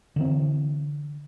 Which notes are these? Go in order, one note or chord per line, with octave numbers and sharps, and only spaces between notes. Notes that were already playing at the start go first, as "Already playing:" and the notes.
D3 E3 C4